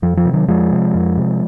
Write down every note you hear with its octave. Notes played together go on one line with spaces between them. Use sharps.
F2 F3
F3
C3
D#3 F#3
F2 F3 G#3
C3
F2
C3